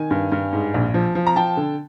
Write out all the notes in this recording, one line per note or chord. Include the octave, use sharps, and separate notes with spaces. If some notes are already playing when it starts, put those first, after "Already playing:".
Already playing: D#3 G#5
G2
G2
G#2
A#1
F3
F3
A#5
F3 G5 A5
D3